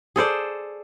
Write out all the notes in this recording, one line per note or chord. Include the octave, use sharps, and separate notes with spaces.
G#4 A4 C5 D5